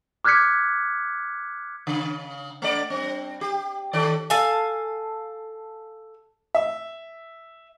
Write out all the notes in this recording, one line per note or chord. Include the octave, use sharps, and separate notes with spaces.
D6 F6 F#6 G#6 B6 C#7
C#3
A3 D5
G2 C4
G4
D#3 A4 D5
A4 F5 G#5
E5